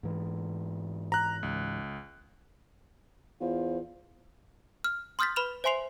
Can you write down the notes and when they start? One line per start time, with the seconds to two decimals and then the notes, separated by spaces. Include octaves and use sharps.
0.03 G#2 E3
1.12 A#5 F#6
1.43 C#2
3.41 E2 F4 C5
4.84 F6
5.19 C6 D#6 F6 G6 A6 B6
5.36 B4 B5 F6 E7 F7
5.64 C5 E5 G#5 C6 C7 F7